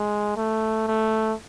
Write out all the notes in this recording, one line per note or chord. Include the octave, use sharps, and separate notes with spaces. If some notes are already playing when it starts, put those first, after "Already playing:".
Already playing: G#3
A3
A3